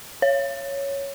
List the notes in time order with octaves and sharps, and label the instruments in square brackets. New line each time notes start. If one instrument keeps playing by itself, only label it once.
[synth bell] C#5